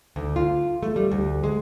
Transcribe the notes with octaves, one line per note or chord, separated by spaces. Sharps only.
D2
F4
A3
G3
D2
G#3